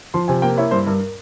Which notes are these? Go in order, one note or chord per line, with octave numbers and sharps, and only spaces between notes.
F3 C6
C3 G#5
A#3 G5
E4 C#5
G2 C5
G2 A#4